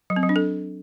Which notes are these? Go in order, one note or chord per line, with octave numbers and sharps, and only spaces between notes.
F#3
C4
F#3
D4
A4